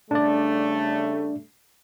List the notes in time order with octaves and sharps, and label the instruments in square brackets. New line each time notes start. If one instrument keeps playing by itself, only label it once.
[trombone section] C#3 G3 A3 [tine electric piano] D4 D5